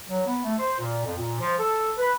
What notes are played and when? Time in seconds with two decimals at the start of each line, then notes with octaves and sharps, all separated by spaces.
0.08 F#3
0.26 B3
0.44 A3
0.59 C5
0.78 A#2
1.04 F2
1.18 A#2
1.40 F3
1.59 A4
1.98 B4